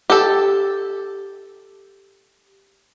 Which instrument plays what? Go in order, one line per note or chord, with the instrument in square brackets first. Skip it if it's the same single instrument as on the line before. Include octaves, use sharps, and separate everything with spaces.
[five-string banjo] G4 A4